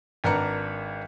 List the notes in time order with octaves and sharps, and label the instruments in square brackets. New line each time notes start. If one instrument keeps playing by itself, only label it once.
[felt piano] G#1 D4 A#4 B4 A#5 C#7